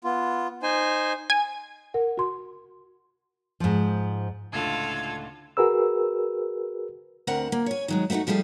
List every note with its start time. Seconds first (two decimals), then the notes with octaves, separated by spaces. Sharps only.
0.04 B3 F4
0.63 D#4 C5 G#5
1.30 G#5
1.94 A#4 F#5
2.18 F#4 C6
3.60 G#2 F3
4.53 C#2 A2 D3 F4 A4 G#6
5.57 F#4 G#4 A#4 B4 E6
7.27 D2 C4 A#4 F#5
7.52 A#3
7.66 C#5 G#5
7.88 D#3 F#3 G#3
8.10 A3 B3 C4 D#4 F#4
8.27 F3 G3 A3 G#4 A4